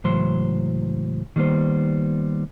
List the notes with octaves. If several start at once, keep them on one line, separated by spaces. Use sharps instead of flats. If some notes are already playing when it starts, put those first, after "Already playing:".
C#2 A2 E3 F#3 C5 C6
D#3 G3 A#3 B3 C5